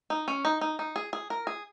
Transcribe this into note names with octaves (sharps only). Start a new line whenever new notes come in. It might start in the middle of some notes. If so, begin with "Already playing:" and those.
D#4
C#4
D#4
D#4
D#4
G#4
G#4
A#4
G#4